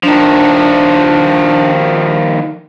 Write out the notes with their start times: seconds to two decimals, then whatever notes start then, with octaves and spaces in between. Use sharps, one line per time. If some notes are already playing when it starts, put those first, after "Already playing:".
0.03 D#3 F3 D4